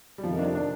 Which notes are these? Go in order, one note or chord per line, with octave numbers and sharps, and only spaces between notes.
G3
F2 C3 D#3 F3
D4
D4